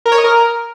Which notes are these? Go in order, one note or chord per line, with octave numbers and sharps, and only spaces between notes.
A#4
C#5
D#5
A#4